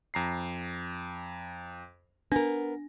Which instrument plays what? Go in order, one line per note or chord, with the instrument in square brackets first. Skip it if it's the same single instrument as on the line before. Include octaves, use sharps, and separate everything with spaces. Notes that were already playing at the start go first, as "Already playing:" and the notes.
[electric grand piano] F2 A#5 C7
[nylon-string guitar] B3 A#4 [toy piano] D4 [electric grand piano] A#6